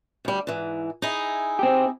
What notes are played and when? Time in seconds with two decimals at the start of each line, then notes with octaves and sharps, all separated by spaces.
0.25 D2 G3
0.47 G#2 E3
1.02 D#4 E4 G#4
1.59 C4 G4